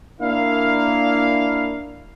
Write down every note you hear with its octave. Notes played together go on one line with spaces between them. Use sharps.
A#3 D4 E4 F5